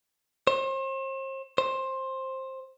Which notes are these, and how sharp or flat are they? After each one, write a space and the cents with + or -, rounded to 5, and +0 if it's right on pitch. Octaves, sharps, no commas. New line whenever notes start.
C5 +40
C5 +15